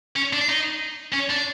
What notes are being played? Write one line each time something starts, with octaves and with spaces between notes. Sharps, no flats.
C#4
D4
D#4
C#4
D4